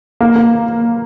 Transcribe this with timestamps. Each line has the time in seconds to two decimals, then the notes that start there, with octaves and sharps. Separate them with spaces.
0.21 A#3
0.36 A#3